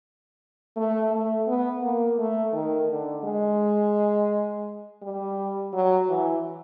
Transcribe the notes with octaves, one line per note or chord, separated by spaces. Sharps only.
A3
A3
B3
A#3
A3
D#3
D3
G#3
G3
F#3
E3